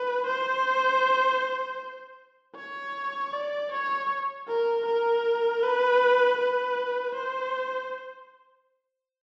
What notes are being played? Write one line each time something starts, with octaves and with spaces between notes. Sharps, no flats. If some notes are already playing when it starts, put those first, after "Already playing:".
Already playing: B4
C5
C#5
D5
C#5
A#4
A#4
B4
B4
C5